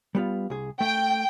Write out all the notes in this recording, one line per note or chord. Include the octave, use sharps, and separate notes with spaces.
G3 B3 F4
C2 G#4
A3 G5